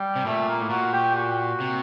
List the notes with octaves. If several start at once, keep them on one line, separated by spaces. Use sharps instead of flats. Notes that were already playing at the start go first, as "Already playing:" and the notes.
Already playing: G3
C3
A#2 A3
A#3
A2
A#2 F#4
G4
F#4
C3